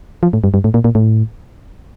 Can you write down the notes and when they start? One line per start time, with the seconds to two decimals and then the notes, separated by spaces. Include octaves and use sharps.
0.23 F3
0.33 A2
0.44 G2
0.54 G2
0.64 A2
0.74 A#2
0.84 A#2
0.95 A2